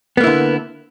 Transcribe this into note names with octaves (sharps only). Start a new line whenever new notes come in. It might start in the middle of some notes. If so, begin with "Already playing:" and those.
D3 A#3 B3 E4